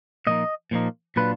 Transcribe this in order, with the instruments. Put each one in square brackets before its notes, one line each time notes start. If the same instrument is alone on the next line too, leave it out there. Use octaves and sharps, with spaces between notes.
[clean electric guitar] A#2 F3 A#3 D#4 D#5
A#2 F3 A#3 D#4
A#2 F#3 D4 F4 B4